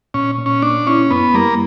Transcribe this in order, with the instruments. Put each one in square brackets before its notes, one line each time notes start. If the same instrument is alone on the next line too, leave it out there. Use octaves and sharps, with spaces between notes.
[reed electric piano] A#2 [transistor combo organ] C#4
[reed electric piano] A#2
[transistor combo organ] C#4
[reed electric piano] A#3 [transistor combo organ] D4
[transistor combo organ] C#4 [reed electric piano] E4
[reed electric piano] F#2 [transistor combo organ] B3
[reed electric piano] G3 [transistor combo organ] A#3